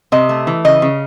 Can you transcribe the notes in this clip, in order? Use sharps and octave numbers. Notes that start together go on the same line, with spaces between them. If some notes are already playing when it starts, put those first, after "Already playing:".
C3 D#5
A3
E3
C#3 D#5
C#3